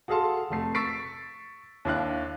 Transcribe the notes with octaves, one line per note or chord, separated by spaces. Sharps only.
F#4 G#4 A4 F5 A5 C6
F1 A3 C7
C#6 E6 A6 B6 C7 D7
D#2 D4 E4 F5 F#6